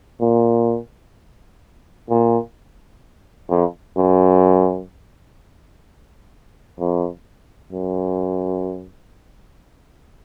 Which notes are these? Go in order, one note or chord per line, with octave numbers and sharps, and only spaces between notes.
A#2
A#2
F2
F#2
F2
F#2